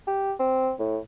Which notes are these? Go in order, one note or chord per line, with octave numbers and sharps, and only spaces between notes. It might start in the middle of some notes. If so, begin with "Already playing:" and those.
G4
C4
A2